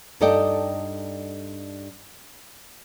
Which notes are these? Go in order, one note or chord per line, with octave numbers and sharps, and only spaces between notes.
G2 D#4 A4 D5 D#5 G5